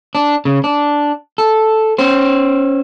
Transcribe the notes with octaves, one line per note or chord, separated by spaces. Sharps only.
D4
C#3
D4
A4
C#4 C5